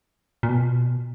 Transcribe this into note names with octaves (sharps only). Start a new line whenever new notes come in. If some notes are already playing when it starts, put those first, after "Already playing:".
A#2
B2